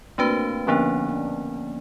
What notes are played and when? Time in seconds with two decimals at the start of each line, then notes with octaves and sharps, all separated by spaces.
0.18 A3 A#3 C4 D4 F#4 B4
0.67 D3 F3 A#3 B3 C#4 D4
1.09 D4